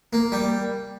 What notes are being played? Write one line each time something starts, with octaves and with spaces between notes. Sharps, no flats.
A#3
G3